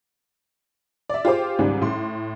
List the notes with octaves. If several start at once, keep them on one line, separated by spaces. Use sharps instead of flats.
D5 E5
F4 G4 G#4 C5 D6
C#2 G#2 D#3 G3
A2 C6